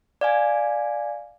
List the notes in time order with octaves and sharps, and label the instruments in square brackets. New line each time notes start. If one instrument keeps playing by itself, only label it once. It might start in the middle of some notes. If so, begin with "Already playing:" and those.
[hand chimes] D5 F5 G#5